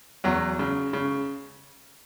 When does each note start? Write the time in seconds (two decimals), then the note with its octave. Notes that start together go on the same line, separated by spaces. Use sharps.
0.24 E2 F#3
0.59 C#3
0.93 C#3